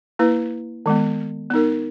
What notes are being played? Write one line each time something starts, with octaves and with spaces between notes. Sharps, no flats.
A#3 E4 B4
D#3 G#3 B3
B3 D#4 A#4